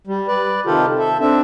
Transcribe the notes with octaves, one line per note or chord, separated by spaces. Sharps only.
G3
B4 D5
C3 D#3 F4 G4 A4
A4 E5
C4 D4 E5